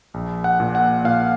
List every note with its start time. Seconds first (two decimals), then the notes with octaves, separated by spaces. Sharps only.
0.14 A#1
0.44 F#5
0.60 A#2
0.75 F#5
1.04 A#2 F5